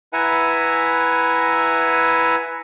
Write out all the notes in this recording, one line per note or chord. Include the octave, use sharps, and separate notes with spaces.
E4 B4 E5 F#5 G#5 A#5